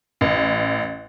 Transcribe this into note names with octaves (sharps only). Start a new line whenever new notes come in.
A1